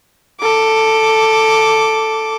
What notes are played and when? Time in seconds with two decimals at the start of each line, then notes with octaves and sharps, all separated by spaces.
0.41 A4 D6